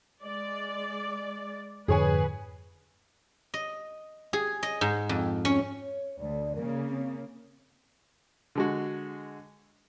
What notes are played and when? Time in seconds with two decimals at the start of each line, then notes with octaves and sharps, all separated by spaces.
0.23 G#3 D5
1.88 F2 G#2 D3 G#4 B4 C#5 G#5
3.54 D#5
4.33 G#4
4.63 D#5
4.81 G#2
5.09 F2
5.45 C#4
5.82 C#5
6.19 D2 D5
6.55 C#3 A#3 A#4
6.87 C4
8.55 D3 G#3 F#4